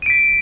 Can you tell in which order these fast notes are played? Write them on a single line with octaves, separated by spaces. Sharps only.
D#7 D7 B6